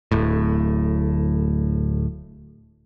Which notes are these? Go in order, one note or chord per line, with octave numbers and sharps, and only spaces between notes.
D1 A2